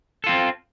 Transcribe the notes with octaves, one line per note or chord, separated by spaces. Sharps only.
C4 F4 A4